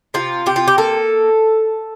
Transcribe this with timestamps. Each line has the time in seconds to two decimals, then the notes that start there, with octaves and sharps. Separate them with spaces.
0.14 C3 F4
0.46 C3 G4
0.56 F4
0.68 G4
0.78 A#3 A4